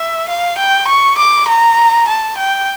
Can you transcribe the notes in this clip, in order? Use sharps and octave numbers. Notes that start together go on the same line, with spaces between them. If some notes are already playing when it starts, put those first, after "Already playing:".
Already playing: E5
F5
G5
C#6
D6
A#5
A5
G5